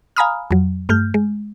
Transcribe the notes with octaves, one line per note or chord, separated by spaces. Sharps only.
F5 G#5 A#5 B5 D#6 F6
F2 F#3
G2 A3 F6 G6
G#3